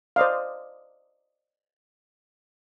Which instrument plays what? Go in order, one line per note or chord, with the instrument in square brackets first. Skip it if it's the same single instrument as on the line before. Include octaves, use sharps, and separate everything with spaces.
[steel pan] C5 D5 D#5 F5